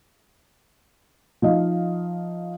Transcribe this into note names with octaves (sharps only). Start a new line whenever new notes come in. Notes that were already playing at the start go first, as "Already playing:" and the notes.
F3 D#4 D#5 F5